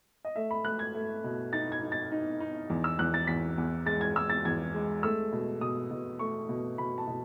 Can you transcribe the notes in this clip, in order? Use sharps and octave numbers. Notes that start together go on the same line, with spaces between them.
D#5
A3 E5
B5
A3 F#6
G#6
A3
B2
D#4 A6
G#6
D#4
A6
D#4
D#4
E2
E6
E2 F#6
A6
E2 B6
E2
G#3 A6
G#6
G#3 E6
A6
E2 G#6
G#3
A3 E6
B2
B2 D#6
B2
A3 C#6
B2
B2 B5
A5
B2